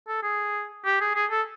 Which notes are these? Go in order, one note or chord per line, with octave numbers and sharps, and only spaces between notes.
A4
G#4
G4
G#4
G#4
A4